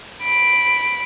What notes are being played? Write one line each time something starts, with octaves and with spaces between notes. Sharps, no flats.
B5 D7